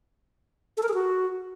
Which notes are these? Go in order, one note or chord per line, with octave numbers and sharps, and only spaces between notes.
A4
A#4
G#4
F#4